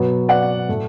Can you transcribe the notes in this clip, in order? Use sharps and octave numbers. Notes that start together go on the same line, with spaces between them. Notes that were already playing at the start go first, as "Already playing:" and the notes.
Already playing: B2 F#3 B3
D5 F#5
A2 A3